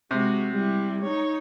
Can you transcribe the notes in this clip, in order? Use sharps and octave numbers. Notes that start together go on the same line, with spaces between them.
C3 G#3 F#4
G3 E4
D#4 C#5